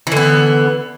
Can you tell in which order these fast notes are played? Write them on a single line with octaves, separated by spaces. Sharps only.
E3 D3 B3